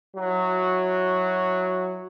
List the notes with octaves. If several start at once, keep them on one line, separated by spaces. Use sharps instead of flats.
F#3 E4 F#4